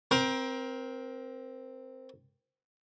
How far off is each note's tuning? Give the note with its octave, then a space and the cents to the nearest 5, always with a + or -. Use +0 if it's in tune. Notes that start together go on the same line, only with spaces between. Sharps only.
C4 +0 A#4 +25